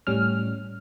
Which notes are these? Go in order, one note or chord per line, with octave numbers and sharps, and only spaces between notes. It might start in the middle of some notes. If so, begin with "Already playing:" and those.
A2 G3 C#4 F6